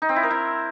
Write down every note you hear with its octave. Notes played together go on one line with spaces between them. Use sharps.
D#4
C4
E4
A#4
E4